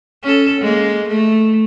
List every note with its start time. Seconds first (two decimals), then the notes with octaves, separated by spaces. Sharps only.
0.23 C#4 A4
0.61 G#3 A#3
1.08 A3